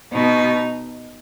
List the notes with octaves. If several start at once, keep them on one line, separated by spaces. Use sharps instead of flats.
B2 D#4